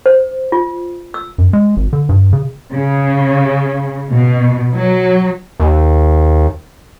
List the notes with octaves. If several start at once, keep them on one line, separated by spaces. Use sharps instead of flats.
C5
F4
E6
F#2
G#3
G#1
D3
G2
C#3
C#3
B2
F#3
D#2